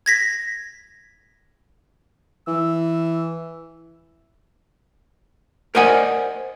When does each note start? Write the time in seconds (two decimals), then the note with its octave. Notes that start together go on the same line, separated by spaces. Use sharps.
0.06 G#6 A#6 B6
2.47 E3 E6
5.75 A#4 C5 D5 D#5 F#5 G#5